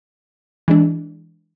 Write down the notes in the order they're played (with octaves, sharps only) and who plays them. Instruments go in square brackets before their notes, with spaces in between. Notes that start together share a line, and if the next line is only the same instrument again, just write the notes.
[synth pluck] E3 G#3 D4